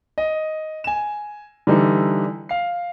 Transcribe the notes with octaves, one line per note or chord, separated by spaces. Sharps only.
D#5
G#5 E7
D3 E3 G3 D#4 E4
F5 C7